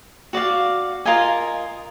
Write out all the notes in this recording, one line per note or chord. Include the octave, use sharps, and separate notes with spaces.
F#4 D5 F5
F4 A#4 D#5 G#5